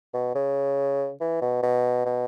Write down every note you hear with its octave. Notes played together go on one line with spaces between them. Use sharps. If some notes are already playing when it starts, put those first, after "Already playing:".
B2
C#3
E3
B2
B2
B2